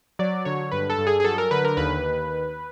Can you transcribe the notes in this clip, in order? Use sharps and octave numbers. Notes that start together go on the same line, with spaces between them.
F#3 D5
D3 C#5
G2 B4
A4
G2
G#4
G#4
F#3 A4
A#4
D3 B4
A#4
D#2 B4
D#2